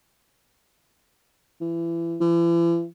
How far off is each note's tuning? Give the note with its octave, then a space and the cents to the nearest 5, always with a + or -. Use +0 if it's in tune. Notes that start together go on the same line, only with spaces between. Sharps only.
E3 +30
E3 +45